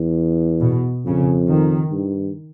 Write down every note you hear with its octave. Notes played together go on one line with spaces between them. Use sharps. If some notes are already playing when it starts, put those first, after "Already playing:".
Already playing: E2
B2
F2 C#3
D#3
G2